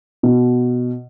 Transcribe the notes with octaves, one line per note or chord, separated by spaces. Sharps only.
B2